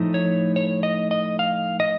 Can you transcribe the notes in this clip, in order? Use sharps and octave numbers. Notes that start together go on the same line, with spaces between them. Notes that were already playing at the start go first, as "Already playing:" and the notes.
Already playing: A2 F3 A3 D#4
C#5
C#5
D#5
D#5
F5
D#5